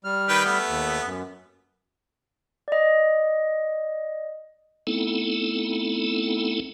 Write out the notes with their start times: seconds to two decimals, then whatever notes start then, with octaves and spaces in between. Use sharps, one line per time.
0.04 G3 F6
0.29 D#3 B4 G5
0.45 A3 B3
0.68 D#2
1.05 F#2
2.68 D5 D#5
4.87 A3 B3 C4 D#4 E4 A4